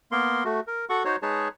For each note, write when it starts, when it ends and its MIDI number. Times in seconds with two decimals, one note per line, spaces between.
0.11 0.44 58
0.11 0.44 59
0.11 0.44 70
0.11 0.44 84
0.45 0.60 57
0.45 0.60 66
0.67 0.85 70
0.89 1.03 66
0.89 1.03 69
0.89 1.03 78
0.89 1.03 85
1.05 1.16 63
1.05 1.16 66
1.05 1.16 72
1.05 1.16 73
1.22 1.48 56
1.22 1.48 63
1.22 1.48 68
1.22 1.48 71
1.22 1.48 73
1.22 1.48 81